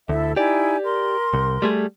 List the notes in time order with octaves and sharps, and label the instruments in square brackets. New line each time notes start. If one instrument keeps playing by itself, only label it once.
[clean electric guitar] D2 [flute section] E4 A4 E5
[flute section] D#4 E4 G#5 [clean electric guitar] G4 D5
[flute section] A#4 C6
[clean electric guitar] C2
G3 A3 G#4